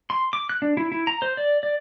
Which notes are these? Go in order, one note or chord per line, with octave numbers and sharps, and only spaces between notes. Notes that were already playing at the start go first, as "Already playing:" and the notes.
C6
D6
F#6
D4
E4
E4
A#5
C5
D5
D5